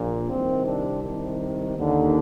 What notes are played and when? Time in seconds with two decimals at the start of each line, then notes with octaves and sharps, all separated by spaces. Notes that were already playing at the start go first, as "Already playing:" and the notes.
Already playing: A#1 A#2
0.29 C2 C3 D#3 C4
0.66 D4
1.03 C2 C3 D#3
1.77 D#2 D3